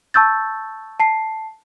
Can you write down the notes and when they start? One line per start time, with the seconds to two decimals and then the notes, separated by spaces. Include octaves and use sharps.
0.14 A5 C#6 E6 G6 A6
1.00 A5 C7